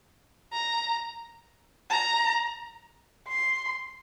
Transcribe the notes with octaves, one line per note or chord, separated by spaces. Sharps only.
A#5
A#5
C6